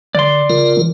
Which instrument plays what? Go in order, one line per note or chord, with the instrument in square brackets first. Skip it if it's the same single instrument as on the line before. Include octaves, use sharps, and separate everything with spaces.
[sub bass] D3 [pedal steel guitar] D5 C6
[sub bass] C#3 [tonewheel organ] F4 A#4
[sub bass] E3